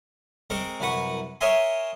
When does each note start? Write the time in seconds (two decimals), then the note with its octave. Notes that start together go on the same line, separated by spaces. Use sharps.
0.50 G#3 C4 A#4 C#6 D6
0.80 C2 F#2 B4 F#5 C#6
1.41 A#4 C#5 D#5 E5 G#5 C6